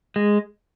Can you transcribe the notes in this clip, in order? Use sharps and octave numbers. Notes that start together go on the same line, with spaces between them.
G#3